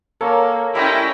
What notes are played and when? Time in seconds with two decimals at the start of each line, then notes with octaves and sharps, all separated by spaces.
0.21 A#3 C#4 A4 A#4
0.75 G3 C#4 E4 D#5 G5 A#5 C6